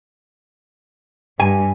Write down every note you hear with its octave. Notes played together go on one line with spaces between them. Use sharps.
G2 G#5